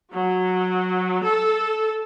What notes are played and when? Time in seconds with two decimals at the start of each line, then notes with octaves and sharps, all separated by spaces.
0.13 F#3
1.24 A4